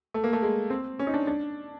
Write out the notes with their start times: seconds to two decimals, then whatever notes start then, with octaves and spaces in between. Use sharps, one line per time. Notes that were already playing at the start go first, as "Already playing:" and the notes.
0.14 A3
0.24 A#3
0.33 A3
0.42 G#3
0.70 C4
0.99 C#4
1.07 D#4
1.14 D4
1.27 D4